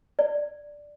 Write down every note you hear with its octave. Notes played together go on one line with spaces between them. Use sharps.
D5